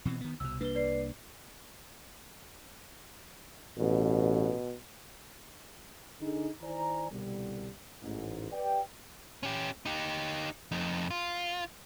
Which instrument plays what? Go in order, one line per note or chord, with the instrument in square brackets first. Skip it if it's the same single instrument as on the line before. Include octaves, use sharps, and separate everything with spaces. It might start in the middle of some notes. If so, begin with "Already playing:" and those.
[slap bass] B2 E3 C4
D#3 B3
[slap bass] C2 B2 [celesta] E6
[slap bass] C2 A#3 D4 [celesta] B4 G7
[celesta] B4 D5 C7
[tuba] A1 [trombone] B2
[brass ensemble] D3 D#4 G#4
D#3 E4 C5 D5 G#5 A#5
C2 B2 D3 G3
A1 G#2
G4 B4 D5 G5
[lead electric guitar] C#4 G4
D#4 G4
F2 D#4
F4